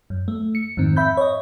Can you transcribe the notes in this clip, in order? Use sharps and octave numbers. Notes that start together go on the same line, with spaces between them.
F#2
A3
C#7
F2 G#2 D#3 C4
E5 B5 G6
C#5 D#5